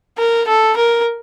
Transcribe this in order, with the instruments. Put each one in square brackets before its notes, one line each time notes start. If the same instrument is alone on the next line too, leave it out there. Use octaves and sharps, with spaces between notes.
[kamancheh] A#4
A4
A#4